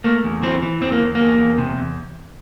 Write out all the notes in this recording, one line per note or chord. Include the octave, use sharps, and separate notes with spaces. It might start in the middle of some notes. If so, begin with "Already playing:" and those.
A3 A#3
E2
E3 C4
E3
E2 C4
A#3
E2
E2 A#3
E2
C3
E2